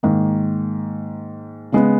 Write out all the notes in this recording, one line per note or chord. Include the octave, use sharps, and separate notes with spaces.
G#2 D#3 A#3
C#3 G#3 B3